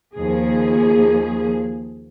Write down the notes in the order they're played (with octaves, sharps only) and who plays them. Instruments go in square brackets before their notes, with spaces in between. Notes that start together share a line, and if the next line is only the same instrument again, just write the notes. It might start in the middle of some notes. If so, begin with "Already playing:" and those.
[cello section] D#2 F3 G#4